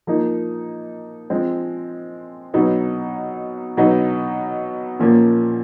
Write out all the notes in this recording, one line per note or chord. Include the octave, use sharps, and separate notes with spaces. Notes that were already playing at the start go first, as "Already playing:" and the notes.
F3 A#3 D#4
F3 G#3 C4
B2 F#3 B3 D#4
B2 F#3 B3 D#4
A#2 F3 A#3 C#4